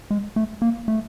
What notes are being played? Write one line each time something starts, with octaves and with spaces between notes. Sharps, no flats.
G#3
A3
A#3
A3